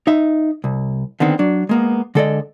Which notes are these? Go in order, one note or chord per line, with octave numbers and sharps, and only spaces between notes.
D#4 E5
C2
D3 D#3 B3 C4
F#3 D4
G#3 A#3 B3
D3 G#3 A4 A#4 D5 D#5